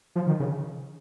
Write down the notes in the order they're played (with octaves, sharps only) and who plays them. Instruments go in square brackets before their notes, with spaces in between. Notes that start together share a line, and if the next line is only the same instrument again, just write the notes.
[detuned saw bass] F3
D#3
C#3